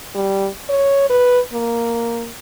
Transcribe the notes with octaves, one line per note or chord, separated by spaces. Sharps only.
G3
C#5
B4
A#3